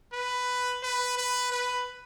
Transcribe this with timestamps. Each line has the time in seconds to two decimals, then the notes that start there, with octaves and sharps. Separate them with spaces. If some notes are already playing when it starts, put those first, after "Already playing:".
0.13 B4
0.83 B4
1.17 B4
1.52 B4